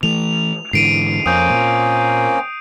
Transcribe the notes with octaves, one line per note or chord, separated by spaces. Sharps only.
E3 A3 F7
G#2 D3 E3 C7 D7 D#7
F2 A#3 C4 C#4 D#6 G6
A#2